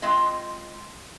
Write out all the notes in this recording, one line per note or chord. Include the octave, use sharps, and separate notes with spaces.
G#3 C4 F4 D#5